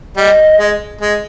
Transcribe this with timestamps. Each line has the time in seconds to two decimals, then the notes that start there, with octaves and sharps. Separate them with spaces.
0.16 G3 D#5
0.59 G#3
1.01 G#3